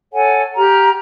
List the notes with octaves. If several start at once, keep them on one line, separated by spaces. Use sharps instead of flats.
A4 C#5 F#5 G#5
G4 A#5 F6